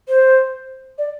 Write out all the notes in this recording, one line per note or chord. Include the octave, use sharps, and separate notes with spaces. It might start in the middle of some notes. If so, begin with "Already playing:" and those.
C5
D5